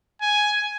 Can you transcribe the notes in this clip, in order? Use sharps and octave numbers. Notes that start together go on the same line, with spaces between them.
G#5